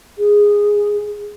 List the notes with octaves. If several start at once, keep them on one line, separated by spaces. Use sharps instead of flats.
G#4